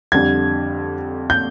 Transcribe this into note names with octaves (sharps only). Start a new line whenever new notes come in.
F2 D3 G3 G#6
G6